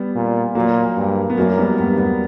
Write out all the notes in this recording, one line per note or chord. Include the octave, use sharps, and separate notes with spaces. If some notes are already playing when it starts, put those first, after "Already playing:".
Already playing: G3 B3
A#2
A#2 F#3 A#3
G2
B3
F#2 F#3 A#3
G3 B3
G2 G3 B3
G3 B3